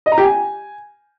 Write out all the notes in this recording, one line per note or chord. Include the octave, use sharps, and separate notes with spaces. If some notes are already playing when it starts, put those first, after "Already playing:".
D#5
A#5
G4
G#5